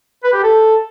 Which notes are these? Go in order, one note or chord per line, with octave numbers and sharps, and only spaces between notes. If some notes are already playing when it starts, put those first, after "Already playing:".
B4
G4
A4